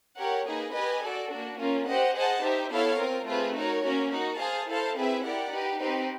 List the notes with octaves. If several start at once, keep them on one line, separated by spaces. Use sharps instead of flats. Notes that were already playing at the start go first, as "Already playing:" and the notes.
G4 A#4 C#5 F#5
A#3 D#4 G#4 B4
G4 B4 D#5 G#5
F#4 A4 D5
A#3 D4 F#4
A#3 C#4 F4 A#4
G4 C5 D#5 F#5
G#4 C5 D#5 F#5 A5
D#4 G4 C5 E5
B3 E4 A4 C#5 F5
C4 F4 A#4
A3 C4 F4 G#4 B4
D#4 F#4 A#4 C#5
A#3 C#4 F#4 A#4
D#4 F#4 A#4
G#4 C5 F5 A5
E4 A4 C5 F5 A5
C4 E4 G#4 B4 E5
E4 G4 A#4 D5 F#5
D#4 G4 B4
C4 D#4 G4 B4